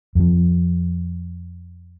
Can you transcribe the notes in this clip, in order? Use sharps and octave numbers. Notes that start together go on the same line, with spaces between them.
F2 F3